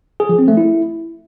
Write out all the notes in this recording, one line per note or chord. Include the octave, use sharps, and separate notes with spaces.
G#4
F3
C4
A3
E4